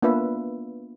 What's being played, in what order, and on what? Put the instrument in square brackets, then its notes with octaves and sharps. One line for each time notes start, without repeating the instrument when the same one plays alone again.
[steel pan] A#3 B3 D4 F4 B4 E5